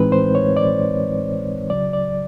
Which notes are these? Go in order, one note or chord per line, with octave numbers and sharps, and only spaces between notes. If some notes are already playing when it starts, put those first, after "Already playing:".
Already playing: A2 E3 G#3 C4 D#4 B4
C5
C#5
D5
C#2 C#3 F#3 D5
D5